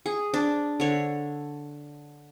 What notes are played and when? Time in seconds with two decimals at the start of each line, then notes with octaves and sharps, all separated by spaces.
0.06 G#4
0.34 D4
0.80 D3 C#5